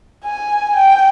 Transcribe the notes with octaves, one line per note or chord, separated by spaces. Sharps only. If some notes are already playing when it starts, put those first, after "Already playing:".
G#5
G5